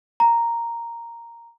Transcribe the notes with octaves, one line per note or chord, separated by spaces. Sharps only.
A#5